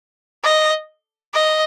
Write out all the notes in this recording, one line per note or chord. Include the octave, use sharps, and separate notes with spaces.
D#5
D#5